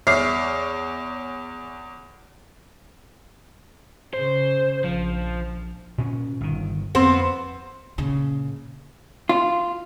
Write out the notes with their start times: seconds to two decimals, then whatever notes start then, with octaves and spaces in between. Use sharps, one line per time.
0.07 E2 C#5 E5 D6 F6 C7
4.14 C#3 C5
4.84 A#1 F3
5.98 A#2 C#4
6.41 G1 D#3
6.95 F2 B3 C4 C5
7.98 A#2 C#3
9.29 F4